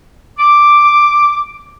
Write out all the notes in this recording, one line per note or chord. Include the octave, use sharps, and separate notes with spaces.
D6